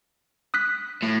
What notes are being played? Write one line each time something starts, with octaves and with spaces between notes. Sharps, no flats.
D#6 F#6 B6
A2